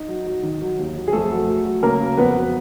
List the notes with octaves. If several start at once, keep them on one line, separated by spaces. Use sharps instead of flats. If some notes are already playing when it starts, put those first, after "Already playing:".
Already playing: D#4
F#3
F#3
D#3
F#3
D#2
F#3
G#4
F2 A3 A4
F#3
F#3
F#3
C#3 A#3 A#4
F#3
F2 B3 B4
F#3